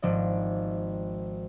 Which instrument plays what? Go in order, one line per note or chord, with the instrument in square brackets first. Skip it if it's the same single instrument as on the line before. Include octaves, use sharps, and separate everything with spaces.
[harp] G#1 F3 D5 D#5